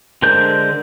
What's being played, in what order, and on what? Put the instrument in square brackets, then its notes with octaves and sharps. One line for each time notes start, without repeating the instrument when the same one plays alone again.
[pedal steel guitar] D3 G#3 A#4 C5 G6